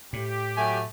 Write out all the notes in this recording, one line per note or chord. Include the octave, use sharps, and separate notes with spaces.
A2 G4
F#3 A3 G#5